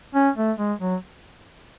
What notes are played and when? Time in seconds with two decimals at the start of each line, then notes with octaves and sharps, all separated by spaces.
0.15 C#4
0.37 A3
0.58 G#3
0.80 F#3